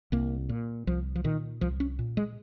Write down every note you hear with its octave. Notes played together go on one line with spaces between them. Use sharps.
C2 A#3
A#2
C2 F3
F3
A#2 D#3
C2 F3
C#4
A#2
G#3